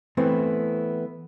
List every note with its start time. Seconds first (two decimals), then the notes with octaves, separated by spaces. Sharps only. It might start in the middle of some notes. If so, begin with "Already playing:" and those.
0.17 E3 A3 B3 C4 E4